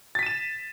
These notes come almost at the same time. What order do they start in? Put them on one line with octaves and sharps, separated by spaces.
A6 B6 D#7 E7